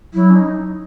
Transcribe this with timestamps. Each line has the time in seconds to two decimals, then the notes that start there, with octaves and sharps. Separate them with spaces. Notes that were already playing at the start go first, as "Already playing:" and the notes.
0.14 F#3 E4
0.30 C#4
0.35 D#4